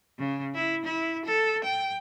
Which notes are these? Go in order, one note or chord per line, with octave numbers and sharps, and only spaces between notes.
C#3
E4
E4
A4
G5